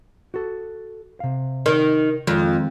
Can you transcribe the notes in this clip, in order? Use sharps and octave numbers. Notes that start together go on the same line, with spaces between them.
F#4 A4
C3 F5
D#3
F2 D#3 F3 G#3